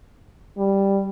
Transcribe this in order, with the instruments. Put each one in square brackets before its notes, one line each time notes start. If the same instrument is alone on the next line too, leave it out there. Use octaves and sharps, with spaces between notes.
[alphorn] G3